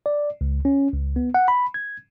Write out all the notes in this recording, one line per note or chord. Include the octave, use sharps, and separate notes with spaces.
D5
C#2
C#4
C#2
B3
F#5
B5
G#6